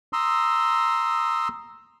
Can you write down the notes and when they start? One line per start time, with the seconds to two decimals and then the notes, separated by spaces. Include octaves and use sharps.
0.13 A#5 C6 D#6 E6